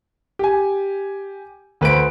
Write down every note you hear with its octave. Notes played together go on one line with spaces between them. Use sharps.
G4 G#5
D2 B4 C5 D7